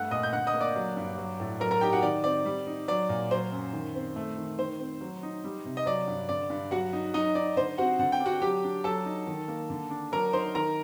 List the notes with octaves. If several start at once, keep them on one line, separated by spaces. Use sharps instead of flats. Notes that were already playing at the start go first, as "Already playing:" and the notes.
Already playing: G2 A3 F#5 F#6
A#2 D#5 D#6
G6
D3 F#5 F#6
D#5 D#6
A#3
D5 D6
F#3
G2
F#3
A2
F#3 A#4 A#5
A#4 A#5
D#4 G4 G5
F#4 F#5
D#3 D5
C4 D5
G3
D#4
F#3 D5
A#2
F#3 C5
F#2
D#3
C4
A3
D#3
D#3 C5
C4
F#3
D#4
G3
C3
D#5
F#3 D5
G2
D3 D5
G2
F#3 F#4 F#5
D#4
F#3 D#4 D#5
D#4 D5
D3 C5
C4 F#4 F#5
D3 F#5
G5
D4
F#4 F#5
F#3 G4 G5
D4
F#3 A4 A5
D#4
D#3
A#3
D3
D4
F#3 A#4 A#5
D#4 C5 C6
D#3 A#4 A#5